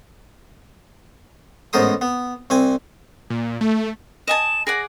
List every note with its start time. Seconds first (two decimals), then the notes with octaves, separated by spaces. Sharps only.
1.73 A1 G#2 B3 A#4 C5 D#6
2.01 B3
2.50 C2 C4 G#5
3.30 A#2
3.61 A3
4.27 D#5 G#5 A5 E7
4.67 G#4 D5 F#5 A#6